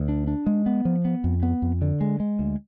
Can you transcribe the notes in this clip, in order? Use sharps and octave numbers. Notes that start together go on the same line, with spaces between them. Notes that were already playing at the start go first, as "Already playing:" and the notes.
Already playing: D2
D4
D4
G#3
B3
F3
B3
F2
B3
F2
D3
G#3
G#3
D2